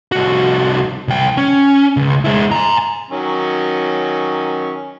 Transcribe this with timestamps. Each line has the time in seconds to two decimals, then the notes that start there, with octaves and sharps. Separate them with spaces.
0.12 C2 F#4
1.08 C2 G5
1.37 C#4
1.97 C#2
2.25 G#3 E4
2.52 G#5 A#5
3.10 D#3 F#3 C#4